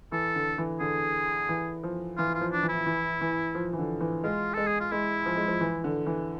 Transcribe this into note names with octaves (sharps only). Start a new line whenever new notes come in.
E3 A4
D3
E3
D3 G#4
E3
F3
E3 F4
F4
F3
D4
E3
E4
E3
E3
F3
E3
D3
E3
G#3 F4
G#3 A4
G#4
F4
G#3 E4
F3
G#3
F3
E3
D3
E3